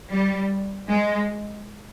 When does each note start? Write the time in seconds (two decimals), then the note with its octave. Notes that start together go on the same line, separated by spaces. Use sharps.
0.10 G3
0.88 G#3